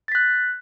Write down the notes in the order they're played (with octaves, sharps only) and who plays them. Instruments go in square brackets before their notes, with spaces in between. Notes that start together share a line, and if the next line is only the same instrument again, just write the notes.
[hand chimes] A6
B6
F#6